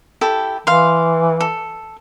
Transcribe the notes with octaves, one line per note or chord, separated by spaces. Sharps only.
E4 G4 A4
E3 F5 C6
A4